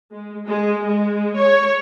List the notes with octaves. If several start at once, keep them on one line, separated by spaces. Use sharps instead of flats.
G#3
G#3
G#3
C#5